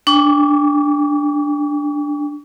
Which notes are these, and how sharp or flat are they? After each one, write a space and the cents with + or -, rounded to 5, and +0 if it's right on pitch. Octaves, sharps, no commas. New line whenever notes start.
D4 +0 G5 +40 C#6 +40